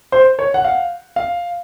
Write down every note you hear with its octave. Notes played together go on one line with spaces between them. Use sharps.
C5
C#5
F#5
F5
F5